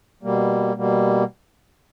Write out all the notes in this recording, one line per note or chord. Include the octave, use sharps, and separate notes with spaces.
B2 G3 A#3
B2 G3 A#3